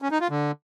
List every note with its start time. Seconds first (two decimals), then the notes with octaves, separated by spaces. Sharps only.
0.02 C#4
0.11 D#4
0.21 F4
0.30 D3